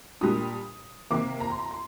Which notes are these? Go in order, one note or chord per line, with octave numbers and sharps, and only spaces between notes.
A#2 G3 D4 D#6
C3 D#3 A#3 D6
A#5
C6
A#5
C6